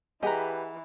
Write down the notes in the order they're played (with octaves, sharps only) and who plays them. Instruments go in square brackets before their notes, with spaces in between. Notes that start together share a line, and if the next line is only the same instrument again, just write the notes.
[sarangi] E3 [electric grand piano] G4 B4 [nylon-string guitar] G#4 F#5 G#5 [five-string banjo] D#5 A#5